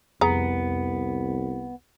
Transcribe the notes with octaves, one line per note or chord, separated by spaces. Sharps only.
C2 F2 B3 G#4 A#5